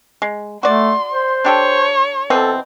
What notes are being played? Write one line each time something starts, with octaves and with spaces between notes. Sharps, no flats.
G#3
A3 F#4 D5 C6
C5
D4 G4 A4 C#5
B2 E3 C4 A4